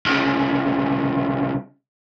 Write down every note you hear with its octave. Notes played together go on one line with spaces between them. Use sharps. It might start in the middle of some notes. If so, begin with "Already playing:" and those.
C2 C#3